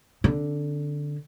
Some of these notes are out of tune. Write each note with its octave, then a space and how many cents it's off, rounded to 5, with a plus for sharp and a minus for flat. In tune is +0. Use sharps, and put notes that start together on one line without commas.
D3 +0 C4 +45